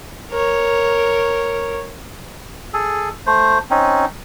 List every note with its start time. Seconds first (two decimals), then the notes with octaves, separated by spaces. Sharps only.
0.31 A#4 C#5
2.73 G#4 A4
3.27 A3 C5
3.70 C4 C#4 D#4